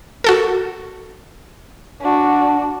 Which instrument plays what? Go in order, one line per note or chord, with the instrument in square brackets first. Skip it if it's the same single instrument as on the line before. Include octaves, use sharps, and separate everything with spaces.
[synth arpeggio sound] F#4 A4 A#4
[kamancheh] D4 F#4